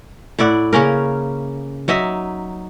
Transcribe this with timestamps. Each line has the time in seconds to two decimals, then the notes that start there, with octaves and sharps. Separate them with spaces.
0.39 A2 E4 D5 F#5
0.73 C#3 A#3 C#4 A#4
1.88 F#3 D#4 D#5 E5